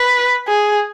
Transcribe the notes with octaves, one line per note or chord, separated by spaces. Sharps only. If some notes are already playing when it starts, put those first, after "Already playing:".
Already playing: B4
G#4